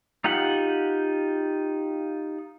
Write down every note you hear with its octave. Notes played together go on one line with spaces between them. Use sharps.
D#4 F4 G4 F#5